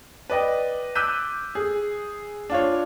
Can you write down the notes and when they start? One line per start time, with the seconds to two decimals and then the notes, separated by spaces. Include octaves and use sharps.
0.30 B4 D5 D#5 G5
0.95 D6 E6 F#6 G6 B6 D#7
1.55 G#4
2.50 D4 F4 C#5